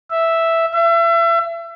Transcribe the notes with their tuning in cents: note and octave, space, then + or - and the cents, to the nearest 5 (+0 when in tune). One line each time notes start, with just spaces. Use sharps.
E5 +0
E5 +35